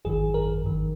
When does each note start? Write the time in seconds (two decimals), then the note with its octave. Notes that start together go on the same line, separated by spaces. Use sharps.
0.05 G#1 F#2 D#3 G#4
0.34 A#4
0.65 G#1 F#2 D#3